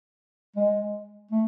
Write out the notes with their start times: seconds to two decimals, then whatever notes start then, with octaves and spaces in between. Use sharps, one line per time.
0.56 G#3
1.31 A3